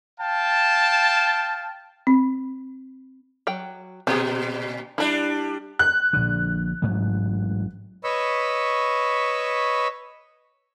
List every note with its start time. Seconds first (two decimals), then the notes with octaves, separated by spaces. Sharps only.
0.20 F5 G5 A5
2.07 C4
3.47 F#3 G5
4.07 A#2 C4 G4 G#4
4.98 G3 D4 E4 B5
5.79 F#6
6.13 A#1 D3
6.82 A1 G#2 F#3
8.04 B4 C#5 D#5 B5 C#6 E6